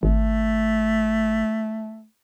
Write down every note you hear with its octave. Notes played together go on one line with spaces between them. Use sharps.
G#1 A3